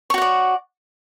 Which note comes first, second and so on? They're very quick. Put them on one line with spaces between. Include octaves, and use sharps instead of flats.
C#5 F#4 F#5 D5